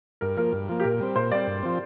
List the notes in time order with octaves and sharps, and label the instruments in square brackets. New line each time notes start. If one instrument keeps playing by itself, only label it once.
[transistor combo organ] G2 [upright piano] A#4
[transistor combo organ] F3 A#3 [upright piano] A#4
[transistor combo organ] G2
F3 A#3
[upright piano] G4
[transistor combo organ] A#2 [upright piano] A#4
[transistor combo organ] G3 C4
[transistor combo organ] A#2 [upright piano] C5
[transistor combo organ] G3 C4 [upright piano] D5
[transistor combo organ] G2
F3 C4